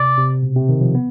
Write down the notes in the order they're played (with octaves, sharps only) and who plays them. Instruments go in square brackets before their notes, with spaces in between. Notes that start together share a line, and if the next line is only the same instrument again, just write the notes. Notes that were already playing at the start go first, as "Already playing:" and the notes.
Already playing: [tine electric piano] C3 [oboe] D5
[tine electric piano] C3
B2
C3
D#3
F3
B3